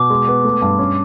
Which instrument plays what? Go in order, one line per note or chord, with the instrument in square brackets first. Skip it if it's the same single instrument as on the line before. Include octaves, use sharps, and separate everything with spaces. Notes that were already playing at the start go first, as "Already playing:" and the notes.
Already playing: [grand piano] B2 [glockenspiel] D6
[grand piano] G#3
B3
A3
G2
C#4